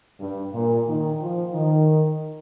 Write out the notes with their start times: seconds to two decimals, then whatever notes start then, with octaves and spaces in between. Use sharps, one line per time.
0.20 G2
0.54 A#2
0.88 D#3
1.22 F3
1.54 D#3